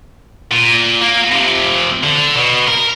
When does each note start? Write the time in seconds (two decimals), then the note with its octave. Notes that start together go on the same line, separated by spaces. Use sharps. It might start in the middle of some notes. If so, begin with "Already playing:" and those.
0.51 A#2
1.02 A#3
1.32 C3 F3
2.03 D3
2.36 B2
2.68 A#4